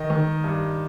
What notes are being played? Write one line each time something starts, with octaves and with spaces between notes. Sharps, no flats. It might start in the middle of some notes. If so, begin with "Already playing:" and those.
Already playing: D#3 D#5
D#3
G2